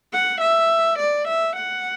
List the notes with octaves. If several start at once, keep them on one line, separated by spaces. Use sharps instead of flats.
F#5
E5
D5
E5
F#5